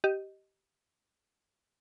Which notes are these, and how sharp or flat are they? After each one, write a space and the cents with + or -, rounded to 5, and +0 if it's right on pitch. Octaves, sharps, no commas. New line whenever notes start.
G4 -15 D#5 +0